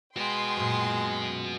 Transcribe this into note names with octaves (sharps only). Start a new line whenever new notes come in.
G#3 F#4 B4 G5 C6
F#2 A#2